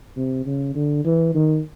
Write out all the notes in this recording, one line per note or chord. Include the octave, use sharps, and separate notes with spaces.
C3
C#3
D3
E3
D#3